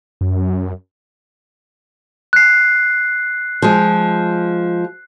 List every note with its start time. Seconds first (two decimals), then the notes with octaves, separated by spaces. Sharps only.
0.21 F#2
2.33 F#6 C7
3.62 F3 G#3